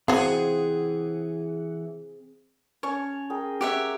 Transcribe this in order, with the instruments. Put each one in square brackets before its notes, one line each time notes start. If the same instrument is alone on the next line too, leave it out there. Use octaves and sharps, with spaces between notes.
[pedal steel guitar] E3 F#5 [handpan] C4 [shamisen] F#4 F5 [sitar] G#4
[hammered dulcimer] C#4 A5 [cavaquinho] C#5
[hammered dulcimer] G#4 A#4 G5
[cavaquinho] G4 C#5 E5 [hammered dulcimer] F#5